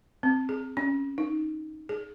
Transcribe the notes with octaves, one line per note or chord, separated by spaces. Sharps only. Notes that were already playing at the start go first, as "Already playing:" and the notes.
C4
G#4
C#4
D#4
G#4